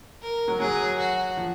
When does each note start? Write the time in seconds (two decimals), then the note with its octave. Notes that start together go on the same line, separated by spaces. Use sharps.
0.22 A#4
0.48 F#3
0.60 F#3 G#4
0.99 F#4
1.37 F3